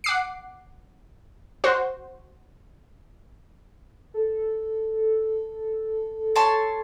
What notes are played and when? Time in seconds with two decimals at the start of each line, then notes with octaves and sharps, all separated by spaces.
0.04 F#5 D6 C7
1.64 F#4 C5
4.14 A4
6.36 C#5 A5 C6